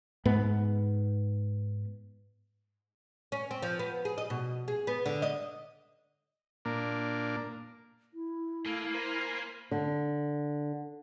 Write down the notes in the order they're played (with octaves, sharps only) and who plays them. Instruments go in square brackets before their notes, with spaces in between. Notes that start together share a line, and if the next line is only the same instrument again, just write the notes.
[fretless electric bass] G#2 B3
[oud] C#4
C4
F3
B3
G#4
D#5
B2
G#4
B3
D3
D#5
[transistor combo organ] A#2 A#3 D4
[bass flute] E4
[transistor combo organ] A3 [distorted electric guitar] A#3 [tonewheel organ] F5 G#5
[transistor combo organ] A#4 C5 B5
[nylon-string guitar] D3